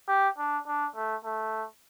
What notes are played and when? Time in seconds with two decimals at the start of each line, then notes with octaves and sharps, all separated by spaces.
0.08 G4
0.38 D4
0.67 D4
0.95 A3
1.25 A3